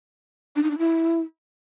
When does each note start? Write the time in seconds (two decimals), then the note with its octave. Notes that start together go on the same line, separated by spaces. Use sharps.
0.56 D4
0.63 D#4
0.71 D4
0.78 E4